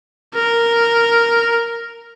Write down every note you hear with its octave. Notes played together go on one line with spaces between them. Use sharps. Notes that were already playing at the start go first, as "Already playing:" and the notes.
A#4